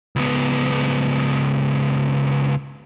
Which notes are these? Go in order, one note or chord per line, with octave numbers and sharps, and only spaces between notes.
C#2 B3